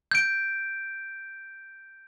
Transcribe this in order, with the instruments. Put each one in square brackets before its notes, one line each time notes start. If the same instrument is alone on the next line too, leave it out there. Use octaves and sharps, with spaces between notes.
[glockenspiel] G6 D7